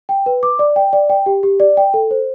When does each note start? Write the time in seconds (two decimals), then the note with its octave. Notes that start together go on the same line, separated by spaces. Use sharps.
0.09 G5
0.26 B4
0.43 D6
0.59 D5
0.76 G5
0.93 D5
1.09 G5
1.26 G4
1.43 G4
1.60 D5
1.77 G5
1.94 A4
2.11 C5